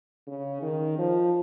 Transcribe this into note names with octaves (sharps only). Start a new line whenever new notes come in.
C#3
D#3
F3